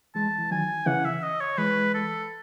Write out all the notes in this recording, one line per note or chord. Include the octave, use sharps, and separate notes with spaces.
E3 G#3 A5
E3
D#3 F#3 G#5
C#3 E3 F#5
E5
D#5
C#5
E3 G#3 B4
A4